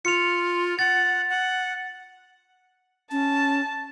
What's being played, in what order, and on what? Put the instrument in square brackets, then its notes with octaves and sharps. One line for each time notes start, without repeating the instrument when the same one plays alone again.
[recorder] F4 [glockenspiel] C#7 F7
[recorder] F#5 [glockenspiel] A6
[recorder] F#5
[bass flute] C#4 [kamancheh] A5